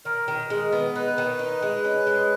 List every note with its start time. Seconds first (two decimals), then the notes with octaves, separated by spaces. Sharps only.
0.05 D#3 A#4
0.28 D#3
0.50 G#3
0.72 B3
0.95 D#4 B4
1.18 D#3
1.39 D#4
1.62 G#3
1.84 C#4
2.07 G#3